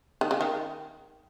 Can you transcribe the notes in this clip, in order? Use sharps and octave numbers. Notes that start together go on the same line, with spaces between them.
D#3
C#3
D#3